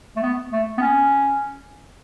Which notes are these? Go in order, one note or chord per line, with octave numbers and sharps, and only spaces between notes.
A3
B3
A3
B3
C#4